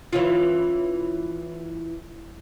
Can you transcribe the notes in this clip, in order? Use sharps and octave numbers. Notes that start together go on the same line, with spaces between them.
E3 C#4 F4